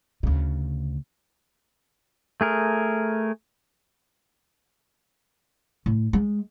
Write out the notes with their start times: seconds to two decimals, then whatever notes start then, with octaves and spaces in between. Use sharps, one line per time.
0.23 D2 C#3
2.41 A3 G#4 A#4
5.86 A2
6.13 G#3